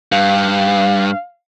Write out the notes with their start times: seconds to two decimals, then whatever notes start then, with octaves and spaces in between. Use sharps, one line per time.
0.12 G2 F5